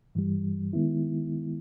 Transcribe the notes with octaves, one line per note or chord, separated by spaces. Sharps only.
G2 E3 G3
D#3 G#3 B3 E4